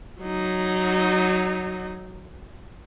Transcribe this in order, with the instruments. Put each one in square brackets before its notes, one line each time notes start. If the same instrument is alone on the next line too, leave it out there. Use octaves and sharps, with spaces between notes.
[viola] F#3 D#4